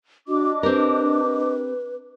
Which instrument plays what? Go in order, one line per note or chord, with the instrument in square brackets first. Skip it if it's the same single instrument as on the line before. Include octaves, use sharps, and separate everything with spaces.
[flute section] D4 D#5 D6 [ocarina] F#4
[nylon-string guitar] C4 G4 A#4 [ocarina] B4